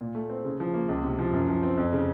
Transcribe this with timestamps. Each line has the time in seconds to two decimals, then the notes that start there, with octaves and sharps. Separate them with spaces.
0.01 A#2
0.15 A3
0.30 C4
0.45 C#3
0.60 F3
0.74 A#3
0.89 C#2
1.04 C3
1.19 F3
1.33 F#2
1.48 F3
1.63 C4
1.77 F2
1.93 C#3